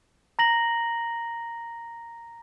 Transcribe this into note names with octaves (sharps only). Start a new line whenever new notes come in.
A#5 A#6 F#7